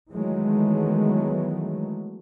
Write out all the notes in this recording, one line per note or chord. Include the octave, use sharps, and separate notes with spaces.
D#3 E3 F#3 G#3 A3 B3